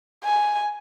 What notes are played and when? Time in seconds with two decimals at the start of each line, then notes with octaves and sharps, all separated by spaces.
0.24 G#5